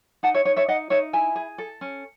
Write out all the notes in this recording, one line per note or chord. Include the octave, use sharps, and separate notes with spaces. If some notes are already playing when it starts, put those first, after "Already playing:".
D#4 F#5 A5
C#5 E5
D#4 C#5
C#5 E5
D#4 D#5 F#5
D#4 C#5 E5
E4 E5 G#5
G#4
A4
C#4